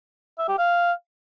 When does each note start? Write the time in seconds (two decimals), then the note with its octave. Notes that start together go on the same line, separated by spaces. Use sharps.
0.39 E5
0.49 G4
0.58 F5